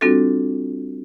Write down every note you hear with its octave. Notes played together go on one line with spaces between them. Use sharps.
G3 C4 D4 F4 F#4 A4